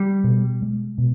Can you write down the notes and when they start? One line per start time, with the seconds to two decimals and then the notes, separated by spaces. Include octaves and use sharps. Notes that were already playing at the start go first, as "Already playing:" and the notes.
Already playing: G3
0.24 B2
0.62 G#3
0.98 B2